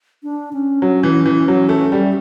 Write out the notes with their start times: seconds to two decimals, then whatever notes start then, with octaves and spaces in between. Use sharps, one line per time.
0.23 D4
0.53 C#4
0.82 F#3
1.03 E3
1.26 E3
1.48 F#3
1.69 A3
1.92 G3